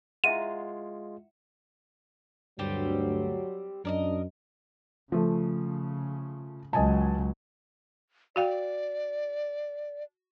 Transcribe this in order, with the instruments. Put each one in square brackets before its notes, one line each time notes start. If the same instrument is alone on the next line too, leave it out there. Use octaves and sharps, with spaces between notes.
[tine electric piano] G#3 F4 [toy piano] E4 E5 F#5 [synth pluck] D#7
[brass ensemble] D2 G2 [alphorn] F#3 [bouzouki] G3 C4 G4
[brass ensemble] F#2 [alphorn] D4 [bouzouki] A#4 D5 D#5
[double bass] C#3 [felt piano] F3 A3
[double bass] C#2 F#3 [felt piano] D#5 G#5 A5
[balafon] F#4 F5 G5 [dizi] D5